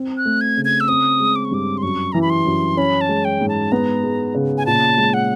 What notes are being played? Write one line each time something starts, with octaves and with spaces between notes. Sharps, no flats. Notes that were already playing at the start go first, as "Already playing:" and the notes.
Already playing: C4
F#6
A3
G#6
C#3
G#6
E6
C4 D#6
G#3
D6
C#6
G2 D6
C6
F#2 C#6
E3 A#5
B5
C6
F#2
C#4 B5
A5
G#3
G5
G#2
A5
B3 A#5
G#3
C#3
G#5
A#2 A5
G#3
F#5